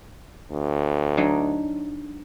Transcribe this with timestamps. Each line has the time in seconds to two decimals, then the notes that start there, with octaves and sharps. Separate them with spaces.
0.51 D2
1.17 F#3 D4 D#4